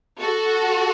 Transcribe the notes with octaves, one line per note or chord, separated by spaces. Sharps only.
F#4 A4